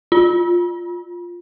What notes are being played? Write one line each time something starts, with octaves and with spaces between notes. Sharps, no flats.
F4